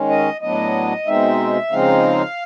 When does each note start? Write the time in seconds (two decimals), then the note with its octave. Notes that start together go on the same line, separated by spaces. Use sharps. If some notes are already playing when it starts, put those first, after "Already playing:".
Already playing: D#3 G#3 C#4
0.10 D#5
0.41 A2 F#3 B3 D4 D#5
1.06 B2 G#3 C4 D#4 E5
1.71 C#3 F3 G#3 C4 D#4 F5